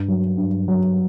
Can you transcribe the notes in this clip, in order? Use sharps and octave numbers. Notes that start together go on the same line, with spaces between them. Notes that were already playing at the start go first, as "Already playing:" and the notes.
Already playing: G2
F#3
G2
F#3